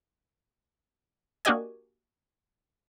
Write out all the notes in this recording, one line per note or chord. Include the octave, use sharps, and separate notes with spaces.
A#3 D4 F#4 G4 D#5 G#5